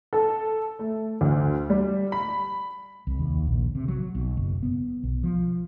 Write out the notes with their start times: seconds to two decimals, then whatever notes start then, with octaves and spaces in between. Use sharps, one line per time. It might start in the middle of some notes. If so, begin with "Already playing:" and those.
0.13 A4
0.79 A3
1.21 D2
1.70 G3
2.12 B5
3.07 C2
3.19 D#2
3.47 A#1
3.75 C3
3.88 F#3
4.15 B1
4.37 F#1
4.63 B3
5.03 B1
5.23 F3